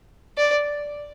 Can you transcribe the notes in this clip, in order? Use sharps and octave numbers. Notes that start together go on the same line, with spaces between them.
D5